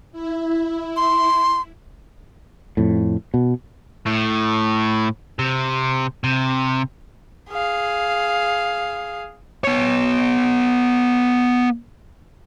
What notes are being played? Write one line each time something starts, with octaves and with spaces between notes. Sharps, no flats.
E4
C6
F2 A2
B2
A2
C3
C3
G#4 F5
B3 C#5